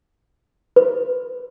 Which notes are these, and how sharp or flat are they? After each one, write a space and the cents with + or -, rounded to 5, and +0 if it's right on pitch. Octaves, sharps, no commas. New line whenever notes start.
B4 +15